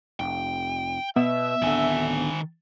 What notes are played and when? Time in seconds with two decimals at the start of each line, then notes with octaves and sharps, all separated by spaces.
0.20 F1 G5
1.16 B2 B3 E5
1.62 D1 D3 D#3 G#5